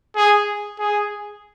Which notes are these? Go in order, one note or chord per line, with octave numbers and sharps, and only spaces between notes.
G#4
G#4